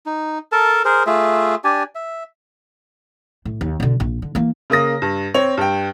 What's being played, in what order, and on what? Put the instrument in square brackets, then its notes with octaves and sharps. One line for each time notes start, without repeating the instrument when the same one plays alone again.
[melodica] D#4
A4 A#4 A5
G#4 A#4 C5
A3 F4 G#4 E5
D4 G4 D5 G#5
E5
[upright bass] A2
D#2
B2 D3
A#1
D3
E3 A#3
[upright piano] C#3 A#3 D#6 A#6
G2
C4 C#5 F7
G2 G5